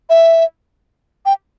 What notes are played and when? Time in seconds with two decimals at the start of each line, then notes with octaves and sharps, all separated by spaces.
0.10 E5
1.26 G5